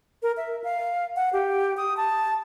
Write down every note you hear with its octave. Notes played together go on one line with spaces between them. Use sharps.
A#4
E5
F5
F#5
G4
D#6
A5